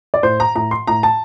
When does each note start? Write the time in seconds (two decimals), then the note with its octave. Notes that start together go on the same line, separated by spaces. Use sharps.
0.14 D5
0.23 A2 C5
0.40 A#5
0.55 A2 A#5
0.71 C6
0.87 A2 A#5
1.03 A5